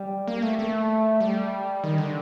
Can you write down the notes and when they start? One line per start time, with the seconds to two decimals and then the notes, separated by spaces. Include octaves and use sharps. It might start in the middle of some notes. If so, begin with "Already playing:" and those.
Already playing: G3
0.28 A#3
0.42 A3
0.59 A3
1.21 G3
1.84 D#3
1.98 D3